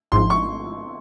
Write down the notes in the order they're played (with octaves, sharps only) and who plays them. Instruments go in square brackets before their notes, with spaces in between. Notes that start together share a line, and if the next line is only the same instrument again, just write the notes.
[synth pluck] G#1 G#2 F3 [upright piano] C6
[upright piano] C#6